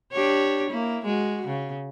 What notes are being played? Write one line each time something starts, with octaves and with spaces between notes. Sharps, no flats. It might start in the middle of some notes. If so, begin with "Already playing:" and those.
D4 G4 C#5
A#3 E4
G#3 F#4
C#3